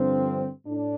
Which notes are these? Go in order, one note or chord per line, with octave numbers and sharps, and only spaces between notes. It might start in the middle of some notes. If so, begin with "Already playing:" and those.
Already playing: G2 D3 F3 C4
A2 D4